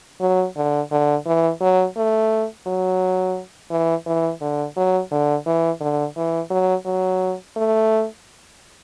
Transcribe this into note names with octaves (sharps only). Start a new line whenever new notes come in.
F#3
D3
D3
E3
F#3
A3
F#3
E3
E3
D3
F#3
D3
E3
D3
E3
F#3
F#3
A3